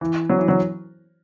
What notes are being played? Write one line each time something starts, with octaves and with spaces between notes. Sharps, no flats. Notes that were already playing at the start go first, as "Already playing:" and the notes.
E3
F#3
E3
F#3